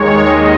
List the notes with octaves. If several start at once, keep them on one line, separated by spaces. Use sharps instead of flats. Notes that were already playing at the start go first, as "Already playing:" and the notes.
Already playing: D#2 D#3 G#3 C#5
D#5